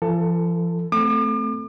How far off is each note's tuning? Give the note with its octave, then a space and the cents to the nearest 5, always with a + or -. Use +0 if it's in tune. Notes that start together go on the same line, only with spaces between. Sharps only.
F3 -40 A4 +25
A3 +0 C4 -20 D6 +40